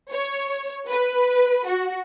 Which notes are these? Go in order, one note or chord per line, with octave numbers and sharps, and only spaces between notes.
C#5
B4
F#4